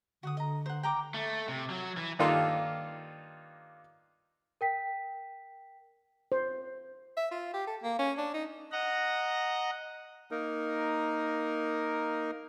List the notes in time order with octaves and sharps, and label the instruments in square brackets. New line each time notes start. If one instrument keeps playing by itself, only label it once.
[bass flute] D3 [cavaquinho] F#4 F#5 D#6
[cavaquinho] D#5 A#5
C5 F#5
G5 A#5 D6
[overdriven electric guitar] A3
C3
F#3
E3
[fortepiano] G2 D#3 A#3 F4 A4 C6
[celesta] A#4 G5 B6
[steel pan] C5
[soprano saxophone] E5
F4
G4
A4
A#3
C#4
D4
D#4
[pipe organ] D#5 F#5 A#5
[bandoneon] A#3 D#4 A#4